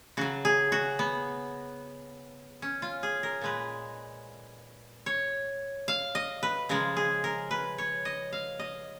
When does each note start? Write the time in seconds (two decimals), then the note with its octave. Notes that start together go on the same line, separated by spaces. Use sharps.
0.17 C#3 F#3 F#4
0.45 G#4
0.72 F#4
0.99 B3
2.62 C#4
2.82 F4
3.03 G#4
3.23 A#4
3.41 A#2 G#3 B4
5.06 C#5
5.88 F5
6.15 D#5
6.43 B4
6.69 C#3 F3 G#3 A#4
6.97 G#4
7.24 A#4
7.51 B4
7.78 C#5
8.05 D#5
8.33 F5
8.59 D#5